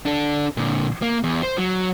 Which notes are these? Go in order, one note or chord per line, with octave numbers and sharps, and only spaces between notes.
D4 A4
A#2 D3
A#3
E2
C5
F#3